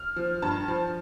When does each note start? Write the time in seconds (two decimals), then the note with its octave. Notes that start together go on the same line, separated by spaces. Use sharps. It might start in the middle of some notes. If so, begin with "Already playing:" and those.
Already playing: F6
0.16 F3
0.42 G2 A5
0.68 F3